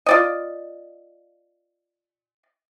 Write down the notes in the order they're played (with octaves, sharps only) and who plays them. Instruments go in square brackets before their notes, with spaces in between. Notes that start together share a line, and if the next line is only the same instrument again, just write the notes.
[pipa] F4 D5 D#5